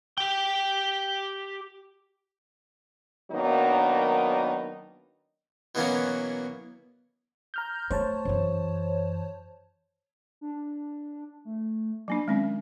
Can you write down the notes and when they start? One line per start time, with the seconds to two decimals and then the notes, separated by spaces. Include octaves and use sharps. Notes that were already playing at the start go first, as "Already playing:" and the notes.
0.18 G4 G5
3.31 D#3 F#3 A#3 B3 D4 D#4
5.75 B2 E3 F#3 A#3 B3 C#4
7.54 A#5 F6 G6
7.91 A3 C5 C#5 A5
8.25 F#2 E3
10.41 D4
11.45 A3
12.08 F#3 A#3 D4 G#5
12.28 D#3 G#3 C4 C#4